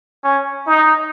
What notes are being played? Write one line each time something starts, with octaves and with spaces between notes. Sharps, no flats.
C#4
D#4